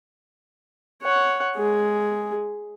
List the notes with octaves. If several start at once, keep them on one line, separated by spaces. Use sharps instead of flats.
C#5 F#5
G#3 G#4